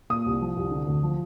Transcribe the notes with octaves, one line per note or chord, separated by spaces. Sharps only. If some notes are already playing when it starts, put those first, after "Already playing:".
A#2 D#6
C2
F3
C2
D3
D2
F3